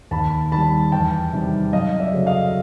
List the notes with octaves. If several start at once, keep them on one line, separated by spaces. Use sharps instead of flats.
D#2 A5 B5
D#3 G3 A5 B5
E2 G5 A5
C3 D#3 G3
F#2 D#5 F5
D5 E5
C#3 F#3 A3
D#5 F5